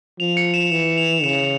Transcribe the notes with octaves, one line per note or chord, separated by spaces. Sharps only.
F3 F7
C#7
E7
E3 E7
F7
C#3 E7